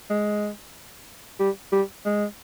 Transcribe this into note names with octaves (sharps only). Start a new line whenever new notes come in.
G#3
G3
G3
G#3